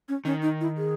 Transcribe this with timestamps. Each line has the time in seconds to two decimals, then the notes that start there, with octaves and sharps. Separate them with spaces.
0.09 C#4
0.25 D#3 C#4
0.42 D#4
0.61 E4
0.78 G#4